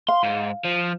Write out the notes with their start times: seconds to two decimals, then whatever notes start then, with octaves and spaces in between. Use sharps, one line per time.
0.08 F5 C6
0.23 G#2
0.64 F3